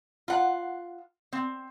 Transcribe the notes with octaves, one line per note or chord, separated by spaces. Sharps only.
F4 F#5
C4